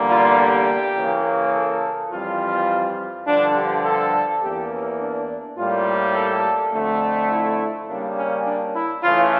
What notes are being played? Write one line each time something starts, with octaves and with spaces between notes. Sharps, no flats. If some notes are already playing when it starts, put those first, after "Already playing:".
Already playing: E2 D3 G3 A#3
F4
G4
C#3 E3 A#3
A4
F2 E3 G3 F4
G2 D3 F3 D4
G4
A4
E2 E3 A#3 G4
C#4
D4
A2 G3 A#3 F4
A4
F2 D3 A3
E4
C#3 G3 A#3 D4
C#4
D4
E4
C#3 E3 A3 F4